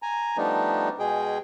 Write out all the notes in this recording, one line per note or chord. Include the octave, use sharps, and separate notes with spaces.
G#5 A#5
F3 G3 A3 B3 D4 D#4
B2 G#3 G#4 G5